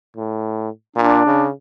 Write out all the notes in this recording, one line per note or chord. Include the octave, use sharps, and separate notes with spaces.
A2
A#2 D4
C#3